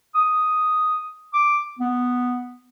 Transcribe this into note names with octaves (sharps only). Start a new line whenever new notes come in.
D#6
D6
B3